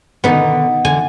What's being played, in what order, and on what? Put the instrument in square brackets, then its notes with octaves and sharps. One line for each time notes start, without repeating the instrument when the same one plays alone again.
[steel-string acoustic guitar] B2 D3 D#3 [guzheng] B3 D#4
[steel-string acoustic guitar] D3 E3 [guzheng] G#5